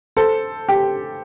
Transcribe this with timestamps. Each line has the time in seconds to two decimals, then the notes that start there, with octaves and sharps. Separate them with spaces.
0.17 A4 C5
0.69 G4